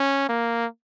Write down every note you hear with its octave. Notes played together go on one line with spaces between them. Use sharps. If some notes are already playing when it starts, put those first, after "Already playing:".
Already playing: C#4
A#3